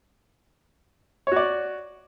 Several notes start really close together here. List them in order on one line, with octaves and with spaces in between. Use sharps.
C#5 F#4 D5